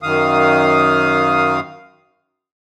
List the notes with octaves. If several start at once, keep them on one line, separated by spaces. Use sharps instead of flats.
F#2 D#3 F5 D#6